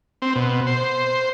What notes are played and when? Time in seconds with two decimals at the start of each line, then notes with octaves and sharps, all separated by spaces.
0.22 C4
0.36 B2
0.67 C5